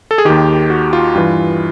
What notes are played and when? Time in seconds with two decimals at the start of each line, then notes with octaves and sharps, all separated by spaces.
0.11 A4
0.18 G#4
0.25 D#2 D#3 G4
0.70 F#4
0.93 F4
1.16 G2 E3 F4